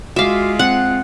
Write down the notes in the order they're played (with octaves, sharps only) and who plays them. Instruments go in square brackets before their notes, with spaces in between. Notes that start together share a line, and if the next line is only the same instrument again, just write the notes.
[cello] G#3 F4 [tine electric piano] F#4 D6 [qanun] E5 F5
[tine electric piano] C4 [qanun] F#5